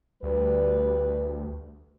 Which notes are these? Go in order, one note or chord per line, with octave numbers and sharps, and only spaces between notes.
D2 G3 B4